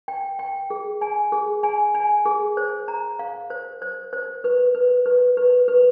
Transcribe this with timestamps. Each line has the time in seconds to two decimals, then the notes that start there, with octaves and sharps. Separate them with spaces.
0.08 G5
0.39 G5
0.70 G#4
1.01 G#5
1.32 G#4
1.63 G#5
1.95 G#5
2.26 G#4
2.57 C5
2.88 A#5
3.19 F5
3.50 C5
3.82 C5
4.13 C5
4.44 B4
4.75 B4
5.06 B4
5.37 B4
5.68 B4